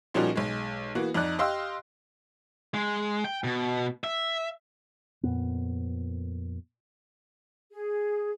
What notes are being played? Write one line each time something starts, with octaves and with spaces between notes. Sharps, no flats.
A#2 F3 G3 C#4 D#4 F#4
B1 G#3
E3 A#3 B3 F#4
F2 D#4 D5 F#6
G4 D#5 F5 C6 E6
G#3
G5
B2
E5
F2 A#2 B3
G#4